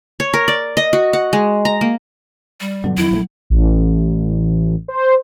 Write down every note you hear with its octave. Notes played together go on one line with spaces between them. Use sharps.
C#5
A#4
D5
D#5
F#4
F#5
G#3
A#5
A#3
G3
G2 B2 D3 F#3
F2 D#3 E4
A#1 E3 A3
A1
C5